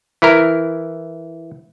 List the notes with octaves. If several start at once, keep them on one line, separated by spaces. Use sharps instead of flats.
E3 E4 A#4